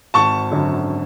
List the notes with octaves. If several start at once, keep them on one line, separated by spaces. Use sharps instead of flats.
G#1 A5 C#6
F#2 D3